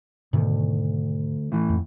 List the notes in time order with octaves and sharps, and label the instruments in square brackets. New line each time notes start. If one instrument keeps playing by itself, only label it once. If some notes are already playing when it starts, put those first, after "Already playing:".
[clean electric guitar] D2 [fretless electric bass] G#2 B2 D#3
[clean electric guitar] A2 E3
[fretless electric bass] F2